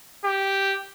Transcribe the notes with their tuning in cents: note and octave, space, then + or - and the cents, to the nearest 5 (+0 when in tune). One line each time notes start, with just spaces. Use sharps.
G4 -5